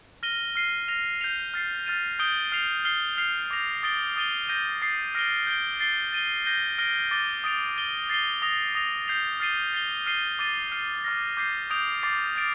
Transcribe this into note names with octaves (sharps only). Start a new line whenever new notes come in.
F6 A#6 D#7 G7
F6 C7 D#7
F6 A#6 F7
G6 C7 F7
F6 A6 C7
F6 A6 D#7
D#6 G6 D7 G7
F6 C7 F7
F6 C7 G7
F6 C7 F7
D6 G6 A#6 F7
D#6 A6 D7 G7
D#6 A6 D#7 G7
G6 A#6 D#7
D#6 A6 C7
F6 A#6 D7 G7
G6 D7 G7
A6 C7 G7
A6 D#7 G7
G6 A#6 D#7 G7
F6 A#6 D7 G7
D6 A6 D#7 G7
D#6 A6 D7 F7
A6 D#7 G7
A6 C7 D#7 G7
D#6 A#6 F7
D#6 A#6 F7
G6 C7 F7
F6 A6 C7 D#7 G7
A6 C7 G7
F6 C7 D#7 G7
D6 A6 D#7 G7
F6 C7 D#7
D6 F6 A#6
D6 G6 C7
D#6 G6 D7 F7
D6 A6 C7
F6 A6 D7